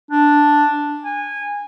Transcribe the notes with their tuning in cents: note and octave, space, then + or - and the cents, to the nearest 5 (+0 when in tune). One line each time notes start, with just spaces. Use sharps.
D4 +0
G#5 -20